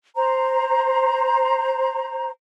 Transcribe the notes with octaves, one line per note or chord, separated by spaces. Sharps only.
C5 A#5